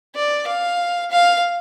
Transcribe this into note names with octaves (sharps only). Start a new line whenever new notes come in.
D5
F5
F5